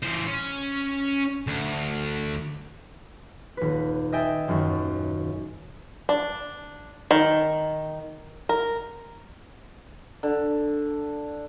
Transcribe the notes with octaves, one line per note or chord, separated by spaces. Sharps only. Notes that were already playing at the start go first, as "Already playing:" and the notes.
E3 C5
C#4
D2
D#1 B4
D#5 E5 G5 G#5 A6
D#1 F#2 D#3 C#6
D4
D#3
A#4
D3